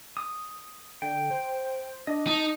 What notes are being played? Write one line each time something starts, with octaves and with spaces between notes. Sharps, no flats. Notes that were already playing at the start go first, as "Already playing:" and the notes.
D#6
D3 G5
C5
D4 D#5
D#4 A5